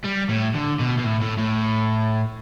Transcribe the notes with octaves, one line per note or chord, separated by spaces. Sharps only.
G3
A2
D3
B2
B2
A2
A2
A2